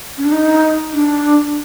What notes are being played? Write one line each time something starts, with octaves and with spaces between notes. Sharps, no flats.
C#4
D4
D#4
D4